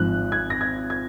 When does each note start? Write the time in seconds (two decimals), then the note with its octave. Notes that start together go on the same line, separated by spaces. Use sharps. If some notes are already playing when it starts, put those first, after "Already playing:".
Already playing: G#1 G#2 F3 F#6
0.32 G#6
0.50 A#6
0.61 G#6
0.90 G#6